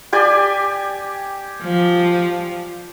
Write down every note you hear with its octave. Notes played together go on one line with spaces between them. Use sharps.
G4 D5 G#5
F3